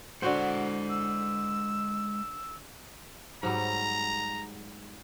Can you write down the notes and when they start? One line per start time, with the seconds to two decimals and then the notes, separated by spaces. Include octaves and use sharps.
0.22 D3 G#3 F#4 C5 F#5
0.90 E6
3.43 G#2 F#3 G3 A#5